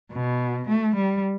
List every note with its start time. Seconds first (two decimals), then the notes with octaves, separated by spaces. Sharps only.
0.12 B2
0.68 A3
0.96 G3